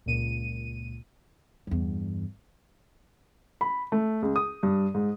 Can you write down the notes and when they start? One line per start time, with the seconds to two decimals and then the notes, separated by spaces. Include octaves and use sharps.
0.06 C#2 A#2 D#7
1.67 E2 G2
3.61 B5
3.92 A3
4.22 C#2
4.36 D#6
4.63 G2
4.94 G#2